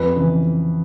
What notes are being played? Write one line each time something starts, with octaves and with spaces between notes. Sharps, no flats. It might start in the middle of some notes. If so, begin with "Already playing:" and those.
Already playing: F2 B4
C#3 E3